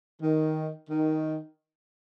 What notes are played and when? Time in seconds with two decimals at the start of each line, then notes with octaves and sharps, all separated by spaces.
0.22 D#3
0.90 D#3